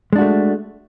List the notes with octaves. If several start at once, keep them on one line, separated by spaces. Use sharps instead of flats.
G#3 A3 D4 F#4